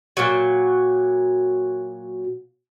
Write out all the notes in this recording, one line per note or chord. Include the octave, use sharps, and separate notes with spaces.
A#2 F#3